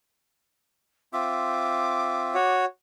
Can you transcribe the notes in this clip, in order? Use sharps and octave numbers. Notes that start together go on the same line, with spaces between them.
C4 F4 E5 D6
F#4 C#5